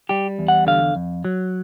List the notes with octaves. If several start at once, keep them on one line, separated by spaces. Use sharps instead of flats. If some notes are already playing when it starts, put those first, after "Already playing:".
G3 G4
E2
F#5
D3 F5
F2
F#3